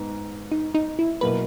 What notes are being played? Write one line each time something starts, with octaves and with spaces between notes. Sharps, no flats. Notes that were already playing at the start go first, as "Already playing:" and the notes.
Already playing: G#2 B3
D#4
D#4
E4
B2 F#3 A#3 E4 A#4 B4